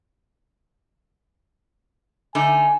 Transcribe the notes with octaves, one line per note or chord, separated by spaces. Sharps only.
D3 A3 D#4 G#5